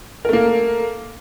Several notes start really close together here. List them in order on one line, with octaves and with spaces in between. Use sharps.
A#4 A3 A#3